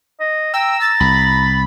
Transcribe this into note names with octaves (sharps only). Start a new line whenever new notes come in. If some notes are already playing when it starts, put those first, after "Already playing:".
D#5
G5 A#5 E6
A6
C2 B5